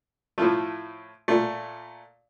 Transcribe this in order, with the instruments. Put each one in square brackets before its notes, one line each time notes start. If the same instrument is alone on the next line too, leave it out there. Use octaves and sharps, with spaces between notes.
[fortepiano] A2 F3 A3
A#2 A3